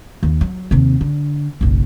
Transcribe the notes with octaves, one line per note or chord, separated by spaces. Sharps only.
D#2
F#3
D#2 C3
D3
F#1 B1